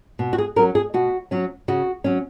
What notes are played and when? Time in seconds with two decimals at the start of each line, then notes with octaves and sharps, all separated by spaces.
0.19 B2
0.33 F#4
0.38 G#4
0.56 F#3 C#4 A#4
0.75 G#4
0.94 B2 F#4
1.31 F#3 C#4
1.68 C#3 F#4
2.04 F#3 C#4